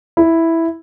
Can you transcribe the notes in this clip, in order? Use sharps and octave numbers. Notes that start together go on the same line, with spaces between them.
E4